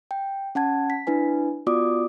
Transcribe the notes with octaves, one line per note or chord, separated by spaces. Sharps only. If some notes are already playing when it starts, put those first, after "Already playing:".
G5
C#4 F#5 A5 G#6
B6
D4 E4 B4 G#5
B3 F4 F#4 D5 D6 D#6